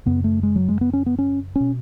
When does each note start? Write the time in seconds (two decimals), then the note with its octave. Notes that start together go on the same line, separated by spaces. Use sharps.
0.06 F#2 C#3 B3
0.24 A3
0.43 G#3
0.56 F#3
0.69 G#3
0.81 B3
0.93 C#4
1.06 B3
1.18 C#4
1.56 B2 C#4